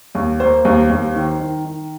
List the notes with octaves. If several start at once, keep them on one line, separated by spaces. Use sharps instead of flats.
D#2
A#3 C5
D#2
D#2
D#3
D#3
D#3